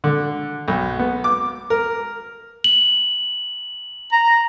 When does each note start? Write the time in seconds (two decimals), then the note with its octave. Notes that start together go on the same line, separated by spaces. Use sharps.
0.04 D3
0.68 B1
0.99 B3
1.24 D6
1.70 A#4
2.64 F#7
4.12 A#5